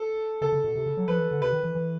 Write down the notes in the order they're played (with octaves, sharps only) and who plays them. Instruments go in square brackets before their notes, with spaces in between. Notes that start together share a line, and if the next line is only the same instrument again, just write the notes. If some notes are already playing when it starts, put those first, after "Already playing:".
Already playing: [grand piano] A4
[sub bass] C#3 [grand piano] A4
[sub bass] C#3
B2
C3
C#3
F#3
[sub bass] F3 [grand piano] B4
[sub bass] E3
D3
[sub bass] C3 [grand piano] B4
[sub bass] D#3
E3
E3